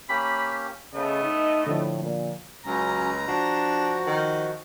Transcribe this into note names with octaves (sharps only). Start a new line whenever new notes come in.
A#3 C#4 G4 B5
C#3 A3 B3 D#5
D#4
A2 D3 F3
A#2
C#2 F#3 C#4 A#5
F3 D4 F#4
D#3